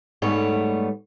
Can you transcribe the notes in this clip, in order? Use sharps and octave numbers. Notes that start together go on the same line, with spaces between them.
G#2 G3 A3 B3 C#5